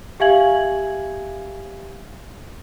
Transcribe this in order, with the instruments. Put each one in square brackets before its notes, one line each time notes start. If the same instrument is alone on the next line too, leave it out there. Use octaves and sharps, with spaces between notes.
[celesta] G4 E5 F5 G#5 G#6 F#7